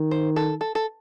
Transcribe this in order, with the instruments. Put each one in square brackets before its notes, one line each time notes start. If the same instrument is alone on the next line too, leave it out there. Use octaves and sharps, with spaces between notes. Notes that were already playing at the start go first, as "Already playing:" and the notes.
Already playing: [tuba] D#3
[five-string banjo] C5
A4
A4
A4